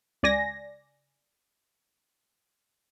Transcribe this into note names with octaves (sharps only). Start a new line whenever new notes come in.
C#2 D5 G#5 A#6